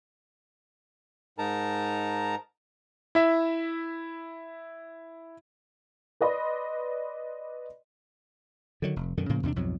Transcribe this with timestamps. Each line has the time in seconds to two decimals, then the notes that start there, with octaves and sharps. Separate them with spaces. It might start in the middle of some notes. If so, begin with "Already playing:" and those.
1.38 G#2 D#4 A#4 A5 A#5
3.15 E4 E5
6.21 B4 D5 D#5 B5 C6
8.82 D3 D#3 F#3
8.96 F1
9.17 F#2 B2 D3 D#3
9.29 A2 C#3 F3 A#3
9.43 E2 C3 B3 D4
9.56 B1 F2 G#2 F#3